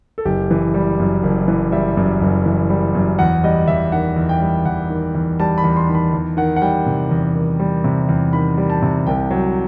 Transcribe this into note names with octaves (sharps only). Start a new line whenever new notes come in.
A4
F#1 G4
E3
G3
F#2
F#1
E3
G3 E5
F#2
F#1
E3
G3
F#2
E2 F#5
G3 D#5
E2 E5
D#3 F#5
E2
G5
G3
E2 F#5
D#3
E2
G3 A5
B5
E2
C6
D#3
B5
E2
D#3 F#5
F#5
G3 G5
C3
E2
D#3
G3
C3
E2
D#3 B5
G3
A5
C3
C2 G5
F#3